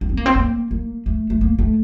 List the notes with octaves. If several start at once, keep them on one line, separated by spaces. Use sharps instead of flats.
D4
C4
A#3
C4
A#3
A#3
A3
A3
A#3
A3